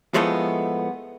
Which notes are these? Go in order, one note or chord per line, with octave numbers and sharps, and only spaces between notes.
A2 F3 G#3 A3 B3